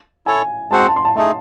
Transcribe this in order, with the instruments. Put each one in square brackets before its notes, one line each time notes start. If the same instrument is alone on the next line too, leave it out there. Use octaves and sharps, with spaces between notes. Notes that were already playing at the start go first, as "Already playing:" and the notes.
[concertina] E4 A4 C#5 [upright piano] G#5
[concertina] G#3 C4 F#4 C5 F#5 [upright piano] A5
[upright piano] C6
A5
C6
A5
[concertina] A3 D#4 G#4 [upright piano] A5